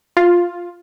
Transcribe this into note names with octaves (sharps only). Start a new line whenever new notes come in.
F4